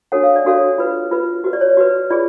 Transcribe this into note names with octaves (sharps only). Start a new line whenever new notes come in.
D4 F#4 A4 C#5 F#5
F5
D5
D4 F#4 A4 C#5 F5
F4 B4
F4 B4
F#4 B4
D5
C#5
F#4 B4
F4 G#4 D5